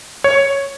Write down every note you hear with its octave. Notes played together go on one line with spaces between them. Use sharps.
C#5